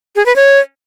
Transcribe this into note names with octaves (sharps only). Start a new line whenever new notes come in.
G#4
B4
C#5